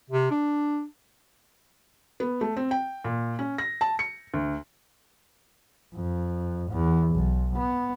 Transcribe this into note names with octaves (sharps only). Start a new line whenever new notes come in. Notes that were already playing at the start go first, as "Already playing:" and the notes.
C3
D4
B3
A3
C4
G5
A#2
C#4
A#6
A5
C#7
D2
F2
E2
B1
B3